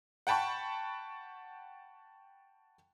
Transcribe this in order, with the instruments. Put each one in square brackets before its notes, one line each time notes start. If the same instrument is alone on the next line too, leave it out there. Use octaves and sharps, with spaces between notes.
[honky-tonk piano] F#5 G5 A5 B5 C#6